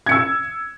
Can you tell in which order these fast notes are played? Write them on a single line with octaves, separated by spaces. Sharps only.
G#6 C#7 E6